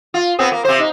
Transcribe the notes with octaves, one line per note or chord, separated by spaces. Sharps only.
F4
B3 C4 G#4
A#3
C3 C5
D#4